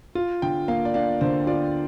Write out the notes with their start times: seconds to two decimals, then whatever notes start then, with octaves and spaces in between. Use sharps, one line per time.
0.15 F4
0.42 D3 G5
0.68 A#3 F5
0.85 D5
0.94 D4 F5
1.21 D3 C5
1.47 F4 D5